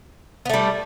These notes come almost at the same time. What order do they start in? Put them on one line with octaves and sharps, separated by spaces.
B3 A3 G3